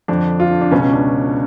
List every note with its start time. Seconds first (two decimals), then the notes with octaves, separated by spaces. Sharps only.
0.08 F2 D3 D4
0.40 F4
0.50 D4
0.61 D4
0.71 C#2 B2 C#4
0.82 C#4
0.93 D4